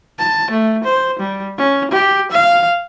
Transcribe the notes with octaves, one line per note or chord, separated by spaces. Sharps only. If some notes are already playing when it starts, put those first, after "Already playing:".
A5
A3
C5
G3
C#4
G4
F5